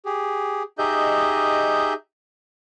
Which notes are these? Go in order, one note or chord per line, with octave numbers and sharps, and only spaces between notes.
G4 G#4
D#4 G4 G#4 D#5 E5 G6